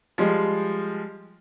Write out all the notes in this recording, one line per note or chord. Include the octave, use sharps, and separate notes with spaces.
F3 G3 G#3